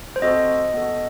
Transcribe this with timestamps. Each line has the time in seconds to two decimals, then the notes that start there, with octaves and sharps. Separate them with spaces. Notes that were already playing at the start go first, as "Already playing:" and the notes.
0.16 C5
0.22 C4 F#4 A4 D#5
0.74 B3 F#4 A4